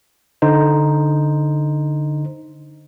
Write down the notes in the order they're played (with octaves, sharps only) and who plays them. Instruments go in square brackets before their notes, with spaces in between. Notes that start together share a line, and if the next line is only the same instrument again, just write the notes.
[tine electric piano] D3 D#4 C5